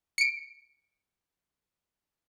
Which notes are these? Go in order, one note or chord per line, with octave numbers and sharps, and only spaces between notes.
C#7 D7